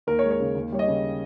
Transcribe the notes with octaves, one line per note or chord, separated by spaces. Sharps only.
D#2 A#4
C#5
G#3
C#5
C#3
D#2
G3 C#5
D#5
C#3